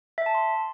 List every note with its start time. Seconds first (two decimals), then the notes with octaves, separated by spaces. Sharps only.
0.18 E5
0.26 A5
0.35 C6